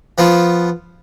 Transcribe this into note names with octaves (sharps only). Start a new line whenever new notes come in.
F3 B3 F4